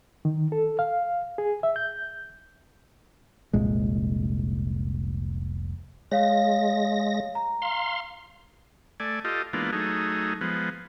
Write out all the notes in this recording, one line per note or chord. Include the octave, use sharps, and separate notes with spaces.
D#3
A4
F5
G#4
E5
G6
F1 C2 A#2 G#3
G#3 C#5 F5 A#6
A#5
F5 C6
A3 D5 G#5
F4 G4 A4 D#5
E3 G#3 A#3 B3 D4 F4
F#3 A3 D#4 G#4
F3 G#3 B3